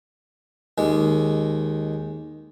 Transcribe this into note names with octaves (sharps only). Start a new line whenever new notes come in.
D#2 G#3